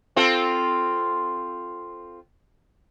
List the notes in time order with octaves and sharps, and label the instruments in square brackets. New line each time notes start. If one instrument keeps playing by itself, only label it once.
[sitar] C4 F4 A4